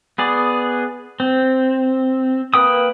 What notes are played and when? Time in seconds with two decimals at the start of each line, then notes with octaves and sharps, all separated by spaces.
0.18 B3 G#4 D5
1.20 C4
2.54 A#3 B4 G5 D#6